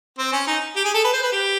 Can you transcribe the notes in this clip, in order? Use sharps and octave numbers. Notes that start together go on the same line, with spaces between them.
C4
C#4
D#4
G4
G#4
A4
B4
C5
B4
G4